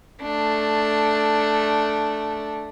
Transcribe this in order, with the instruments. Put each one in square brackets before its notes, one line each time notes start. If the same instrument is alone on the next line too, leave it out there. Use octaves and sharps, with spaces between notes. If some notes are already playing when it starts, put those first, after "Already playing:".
[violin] A3 D4